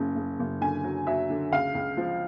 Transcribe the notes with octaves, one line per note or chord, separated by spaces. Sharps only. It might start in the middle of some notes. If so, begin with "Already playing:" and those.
Already playing: F#1 C#3
C#3
F#1
D3 G#5
F#3
F#3 E5
D3
C#2 F5
C#2
F3